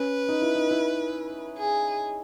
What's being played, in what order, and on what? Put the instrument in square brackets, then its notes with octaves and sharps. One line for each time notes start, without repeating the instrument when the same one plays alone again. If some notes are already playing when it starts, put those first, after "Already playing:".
Already playing: [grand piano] C#4 [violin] B4
[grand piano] D#4
E4
D#4
E4
[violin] G#4